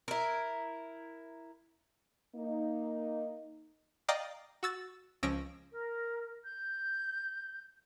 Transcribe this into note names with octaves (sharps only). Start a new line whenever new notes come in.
E4 A#4
A#3 D#4
D5 D#5 F5 G5 A#5 D#6
F#4 E6 A6
C#2 F3 C#4 E6 A#6 D7
A#4
G6